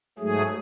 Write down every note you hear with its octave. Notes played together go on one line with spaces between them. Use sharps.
G#2 F#3 A3 G#4